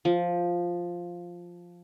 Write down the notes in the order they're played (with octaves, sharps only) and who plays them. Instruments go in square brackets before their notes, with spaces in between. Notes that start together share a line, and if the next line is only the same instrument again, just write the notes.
[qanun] F3